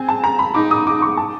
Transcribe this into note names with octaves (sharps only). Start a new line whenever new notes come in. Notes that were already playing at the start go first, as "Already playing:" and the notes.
Already playing: C4 G#5
A5
A#5
B5
D#4 D6
D#6
D6
C#6
A5